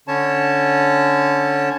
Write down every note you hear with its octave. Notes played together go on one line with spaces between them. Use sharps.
D3 C#4 C#5 A5